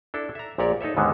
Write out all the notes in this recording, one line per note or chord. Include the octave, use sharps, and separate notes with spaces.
D4 E4 A4
E5 A#5
A#1 A#2 G4 A#4 C#5 D5
D#4 A4 C#5 E5
D#2 G#2 D3 D#3 G#3 B3